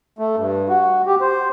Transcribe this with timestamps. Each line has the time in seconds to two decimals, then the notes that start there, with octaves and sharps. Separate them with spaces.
0.19 A3
0.36 G2
0.69 F#4
1.07 G4
1.21 C5